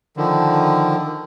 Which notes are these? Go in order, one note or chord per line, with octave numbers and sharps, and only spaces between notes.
D3 D#3 F3